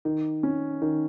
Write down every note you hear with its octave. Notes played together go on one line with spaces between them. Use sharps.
D#3
C#4
D#3